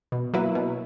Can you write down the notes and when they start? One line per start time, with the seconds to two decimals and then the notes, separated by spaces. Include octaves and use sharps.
0.12 B2
0.34 F#3 A#3 E4 B4
0.55 B2